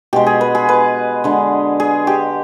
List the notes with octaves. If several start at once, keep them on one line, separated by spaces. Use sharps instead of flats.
B2 G#3 G4
G#4
B4
G#4
B4
D3 G#3
G#4
G4